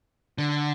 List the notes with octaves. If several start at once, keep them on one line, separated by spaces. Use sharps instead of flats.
D3